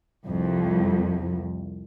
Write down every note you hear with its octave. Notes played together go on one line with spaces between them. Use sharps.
C2 F2